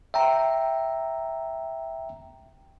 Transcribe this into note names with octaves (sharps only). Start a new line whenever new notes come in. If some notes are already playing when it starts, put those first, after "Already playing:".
E5 G5 A#5